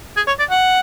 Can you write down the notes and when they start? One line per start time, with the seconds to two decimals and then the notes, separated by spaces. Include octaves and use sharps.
0.16 G#4
0.27 C#5
0.39 D5
0.50 F#5